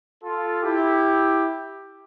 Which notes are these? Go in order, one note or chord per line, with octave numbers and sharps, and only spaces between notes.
F4 A4
E4 G4